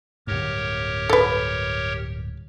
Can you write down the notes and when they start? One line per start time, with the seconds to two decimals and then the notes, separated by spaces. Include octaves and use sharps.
0.27 D1 G2 G4 A#4 C#5
1.10 A4 B4